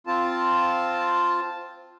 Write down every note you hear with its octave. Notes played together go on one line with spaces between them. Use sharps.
C4 F4 A5